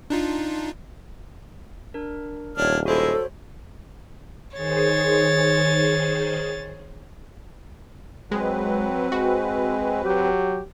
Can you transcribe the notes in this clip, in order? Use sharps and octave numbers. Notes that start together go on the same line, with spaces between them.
D4 D#4 F4
D4 A#4
D#1 D4 C#5 F6
G#3 E4 F#4 A4 C5 C#5
D#3 G#4 C5 C#5 A6
F#3 G#3 C4 B4
G#3 F#4
F#3 G4